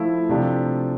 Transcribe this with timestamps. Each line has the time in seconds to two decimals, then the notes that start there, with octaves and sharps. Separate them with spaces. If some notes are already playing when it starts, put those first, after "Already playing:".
Already playing: F3 A3 E4
0.29 C3 F3 A3 D4 G4